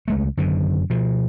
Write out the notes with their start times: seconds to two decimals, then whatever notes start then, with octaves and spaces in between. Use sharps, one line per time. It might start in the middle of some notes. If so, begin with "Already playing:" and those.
0.08 C#2 G#3 A3
0.37 F#2 D3 D#3
0.90 B2 F3